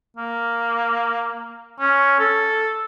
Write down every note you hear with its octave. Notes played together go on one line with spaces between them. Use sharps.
A#3
C#4
A4